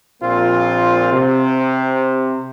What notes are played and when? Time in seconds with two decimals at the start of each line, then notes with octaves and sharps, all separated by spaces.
0.23 A#1 A#2 A#3 C4 F4
1.12 C3